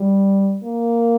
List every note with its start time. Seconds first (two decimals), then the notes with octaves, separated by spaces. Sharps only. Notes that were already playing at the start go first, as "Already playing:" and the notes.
Already playing: G3
0.63 A#3